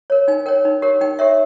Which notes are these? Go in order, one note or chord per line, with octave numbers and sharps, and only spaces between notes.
A#4 C#5
D#4 G#5
A#4 C#5 G5
D#4
G4 A#4 C#5
D#4 G5
G4 A#4 C#5 E5